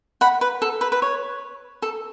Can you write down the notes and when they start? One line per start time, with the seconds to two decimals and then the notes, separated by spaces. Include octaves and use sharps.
0.21 F#5 B5
0.41 B4
0.62 A4
0.81 B4
0.92 B4
1.02 C#5
1.82 A4